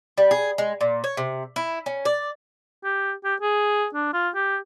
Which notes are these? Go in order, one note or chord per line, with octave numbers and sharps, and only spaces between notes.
G3
G#4
G#3
A#2
C#5
C3
E4
C#4
D5
G4
G4
G#4
D4
F4
G4